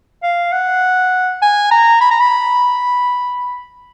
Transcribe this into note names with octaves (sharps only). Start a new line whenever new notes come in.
F5
F#5
G#5
A#5
B5
A#5
B5